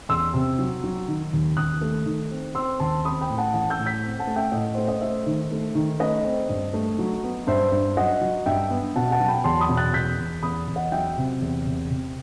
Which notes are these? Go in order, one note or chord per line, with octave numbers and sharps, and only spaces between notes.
E2 C6 E6
C3
F#3
F#3
D#3
D#2
D#2 D#6 F#6
A3
D#3
C4
C4 C6 E6
D#2 A5 C6
C4 B5 D#6
G5 B5
A2
F#5 A5
E3 F#5 A5
E6 G6
A2
G6 B6
C4
F#5 A5
A3
E5 G5
A2 D#5 F#5
A3 C5
D#5
A3 C5 E5
D#3
A3
D#3
A3 B4 D#5
C4
G2
A3
F#3
B3
G2 C5 E5
G2
F#3 D#5 F#5
F#3
G2 E5 G5
B3
B2 F#5 A5
F#5 A5
F#3
G5 B5
E2 A5 C6
B5 D#6
B2
F#6 A6
E2 G6 B6
E2
E2 B5 D#6
E2
D#5 F#5
F#3 E5 G5
C3
E2
C3
C3